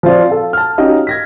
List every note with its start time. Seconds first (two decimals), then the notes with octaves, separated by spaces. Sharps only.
0.03 F3 C4 F4 D5
0.30 A4 F5
0.53 A5 F6
0.78 C#4 D#4 F#4 G4 D#5 F5
1.07 G#6 A#6 B6